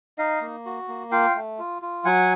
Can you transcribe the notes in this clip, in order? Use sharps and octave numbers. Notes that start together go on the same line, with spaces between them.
D#4 D#5 F5
A#3
F#4
A#3
F4 F5 G5
A3
F4
F4
F#3 F#5 G#5